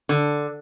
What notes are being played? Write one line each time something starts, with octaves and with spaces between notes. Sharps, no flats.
D3